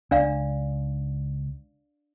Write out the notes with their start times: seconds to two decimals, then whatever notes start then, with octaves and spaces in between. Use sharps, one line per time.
0.11 C#2 D4 D5 F5